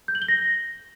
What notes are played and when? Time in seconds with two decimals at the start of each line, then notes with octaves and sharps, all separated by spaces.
0.08 G6
0.15 F#7
0.22 G7
0.28 A#6